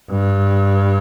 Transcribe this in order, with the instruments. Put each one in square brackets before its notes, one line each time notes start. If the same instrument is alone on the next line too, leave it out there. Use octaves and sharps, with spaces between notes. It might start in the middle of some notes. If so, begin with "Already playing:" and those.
[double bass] G2